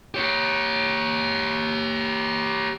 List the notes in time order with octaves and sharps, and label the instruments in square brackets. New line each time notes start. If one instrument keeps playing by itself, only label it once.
[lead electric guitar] G4 C#5